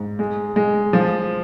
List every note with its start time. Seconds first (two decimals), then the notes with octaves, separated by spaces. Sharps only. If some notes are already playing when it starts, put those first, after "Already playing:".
Already playing: G#2
0.19 G#3
0.56 G#3
0.93 F3